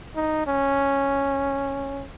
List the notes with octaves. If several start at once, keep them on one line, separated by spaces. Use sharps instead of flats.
D#4
C#4